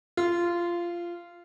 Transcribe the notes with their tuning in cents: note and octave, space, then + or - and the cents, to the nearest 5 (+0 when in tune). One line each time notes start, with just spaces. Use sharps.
F4 -15